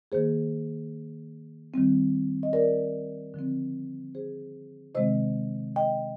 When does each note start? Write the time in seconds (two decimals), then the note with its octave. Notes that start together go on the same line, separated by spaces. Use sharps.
0.12 D#3 A#3 G#4 C5
1.74 D#3 G3 C4
2.43 D#5
2.53 A#4 D5
3.34 D3 F3 C4
4.15 G#4 C5
4.95 C3 D#3 G#3 C4 C5 D#5
5.76 D#5 G5